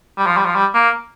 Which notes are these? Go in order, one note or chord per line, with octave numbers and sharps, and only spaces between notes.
G3
F3
G3
F3
G3
A#3